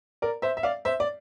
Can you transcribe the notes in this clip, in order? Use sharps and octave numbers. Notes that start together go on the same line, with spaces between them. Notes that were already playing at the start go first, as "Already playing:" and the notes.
A#4 D5
C5 E5
E5
D5 F5
C5 E5
D5